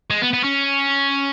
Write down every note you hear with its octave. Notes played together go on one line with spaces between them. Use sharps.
G#3
B3
B3
C#4